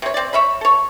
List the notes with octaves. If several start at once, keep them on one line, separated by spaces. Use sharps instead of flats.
C3 C#5
C4 D5
C#5 E5 B5
A4 C#5